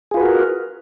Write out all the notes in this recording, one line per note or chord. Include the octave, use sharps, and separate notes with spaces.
F4 F#4 G#4 A#4 B4